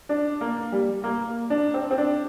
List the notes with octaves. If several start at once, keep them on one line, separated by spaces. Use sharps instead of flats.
D4
A#3
G3
A#3
D4
C4
C4
D4